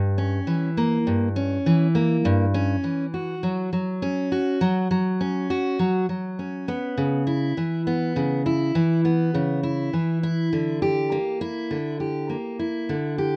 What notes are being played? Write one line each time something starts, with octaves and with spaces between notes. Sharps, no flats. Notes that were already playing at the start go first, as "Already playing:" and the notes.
Already playing: G2
C#4
E3
A#3
G2
C#4
E3
A#3
G2
C#4
E3
F#4
F#3
F#3
C#4
F#4
F#3
F#3
C#4
F#4
F#3
F#3
C#4
B3
C#3
E4
E3
B3
C#3
E4
E3
B3
C#3
E4
E3
E4
D3
G4
A#3
E4
D3
G4
A#3
E4
D3
G4